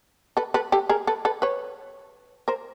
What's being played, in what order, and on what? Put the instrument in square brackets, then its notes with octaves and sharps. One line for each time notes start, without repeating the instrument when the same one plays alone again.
[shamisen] A4 B4
A4 B4
G4 A4
G#4 A#4
A4 B4
A4 B4
B4 C#5
A#4 C5